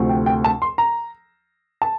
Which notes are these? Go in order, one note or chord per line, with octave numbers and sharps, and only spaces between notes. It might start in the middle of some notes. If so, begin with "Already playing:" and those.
Already playing: D2 C3 F3 A3
G5
G5
A5
C6
A#5
A5